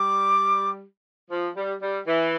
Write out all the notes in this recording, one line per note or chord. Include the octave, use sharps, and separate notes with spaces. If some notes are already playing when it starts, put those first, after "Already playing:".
Already playing: G3 D6
F3
G3
G3
E3